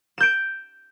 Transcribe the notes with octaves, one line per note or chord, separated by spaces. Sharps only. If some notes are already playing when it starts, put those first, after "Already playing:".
G6 D7 E7